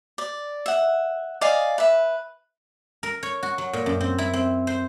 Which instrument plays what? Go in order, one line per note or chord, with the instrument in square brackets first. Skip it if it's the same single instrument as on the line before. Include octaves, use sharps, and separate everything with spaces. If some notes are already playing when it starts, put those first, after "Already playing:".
[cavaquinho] D5
E5 F#5
D5 D#5 F5 G#5
B4 E5
[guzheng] A#4
C#5
F#4
F#3
A#2
F#2
C4
E4
C4
C5